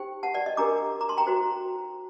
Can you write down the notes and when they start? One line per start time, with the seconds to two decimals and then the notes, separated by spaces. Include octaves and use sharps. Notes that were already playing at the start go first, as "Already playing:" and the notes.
Already playing: D#4 G4 C5 G5
0.23 F#5 A5
0.34 D5 F#5
0.46 D#5
0.57 D4 G4 A#4 A#5 D6
1.01 A#5 D6
1.09 A5 C6
1.17 G5 A#5
1.26 D#4 F#4 C5